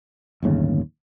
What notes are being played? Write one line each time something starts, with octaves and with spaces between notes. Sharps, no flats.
D1 G1 D#2 C#3